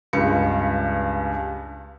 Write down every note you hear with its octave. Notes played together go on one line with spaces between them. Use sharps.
C#2 G2 C#7